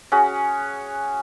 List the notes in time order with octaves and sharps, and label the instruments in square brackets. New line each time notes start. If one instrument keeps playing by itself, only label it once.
[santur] C#4 F#4 G#4